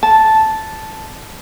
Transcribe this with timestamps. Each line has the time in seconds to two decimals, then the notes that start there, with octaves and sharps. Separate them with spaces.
0.03 A5